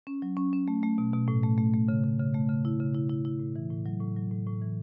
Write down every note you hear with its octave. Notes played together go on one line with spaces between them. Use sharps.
C#4
F#3
C#4
C#4
A3
A3
B2
B2
A2
A3
A3
A3
C#3
C#3
C#3
A3
C#3
E4
C#3
E4
E4
E4
A2
E3
A2
F#3
A2
F#3
A2
A2
E3